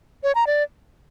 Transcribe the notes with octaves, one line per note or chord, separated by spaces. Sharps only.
C#5
A#5
D5